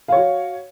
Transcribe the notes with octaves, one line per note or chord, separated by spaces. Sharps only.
F#4 C#5 F5